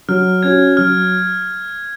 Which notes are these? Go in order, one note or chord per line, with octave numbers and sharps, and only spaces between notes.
F#3 F6
C#4 F#4 G#6
F#3 F6